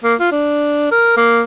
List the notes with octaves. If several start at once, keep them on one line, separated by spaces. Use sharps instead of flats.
A#3
F4
D4
A#4
A#3